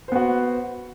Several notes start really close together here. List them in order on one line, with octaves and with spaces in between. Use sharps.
C5 B3 F#4